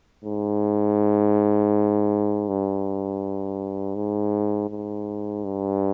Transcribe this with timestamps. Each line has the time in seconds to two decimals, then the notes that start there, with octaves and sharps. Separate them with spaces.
0.24 G#2
2.48 G2
3.95 G#2
4.70 G#2
5.44 G2